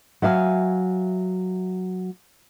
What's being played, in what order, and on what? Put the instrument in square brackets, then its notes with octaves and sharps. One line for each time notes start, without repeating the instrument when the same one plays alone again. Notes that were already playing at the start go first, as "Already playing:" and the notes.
[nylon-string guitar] F#3 E5 F5 G#5